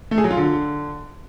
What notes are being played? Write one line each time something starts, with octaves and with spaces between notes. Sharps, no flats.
A3
G#4
F#3
F4
D3